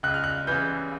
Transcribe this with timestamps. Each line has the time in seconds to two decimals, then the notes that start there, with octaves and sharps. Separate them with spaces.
0.03 C#2 F#6
0.14 F6
0.24 F#6
0.47 C#3 E3 G6